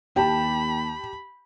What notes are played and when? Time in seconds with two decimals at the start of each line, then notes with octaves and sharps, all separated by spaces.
0.16 D#2 G4 G5 A5 B5